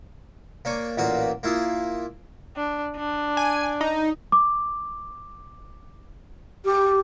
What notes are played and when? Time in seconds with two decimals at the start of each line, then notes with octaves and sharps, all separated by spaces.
0.65 A#3 D4 C#5 G#5 C#6
0.97 A1 A#2 A#3 F#4 B4
1.43 A#3 E4 F4 G#4
2.57 D4
2.97 D4
3.37 G#5
3.81 D#4
4.32 D6
6.65 G4